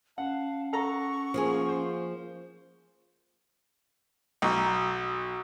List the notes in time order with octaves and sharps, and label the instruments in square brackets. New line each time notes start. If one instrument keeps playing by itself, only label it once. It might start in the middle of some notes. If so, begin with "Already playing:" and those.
[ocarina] C#4 [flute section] F5 A5 [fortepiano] F#5
[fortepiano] A4 A#5 [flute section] F#5 C#6
[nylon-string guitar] F3 A#3 G#4
[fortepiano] C5
[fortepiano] B1 [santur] F#4 A#5